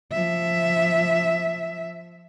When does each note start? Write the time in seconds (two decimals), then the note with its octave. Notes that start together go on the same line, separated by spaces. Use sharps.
0.12 F3 E5